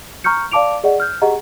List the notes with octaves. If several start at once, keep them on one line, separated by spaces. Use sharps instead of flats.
A#5 C#6 F6 G6 C#7
D5 F5 A5 D6 D7 F7
G#4 D5 D#5 F#5
F6 G6
G4 G#4 D#5 F#5 A#5